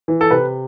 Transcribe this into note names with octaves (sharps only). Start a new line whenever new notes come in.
E3
A4
C3 B4